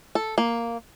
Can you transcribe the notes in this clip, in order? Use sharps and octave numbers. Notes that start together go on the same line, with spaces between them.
A4
A#3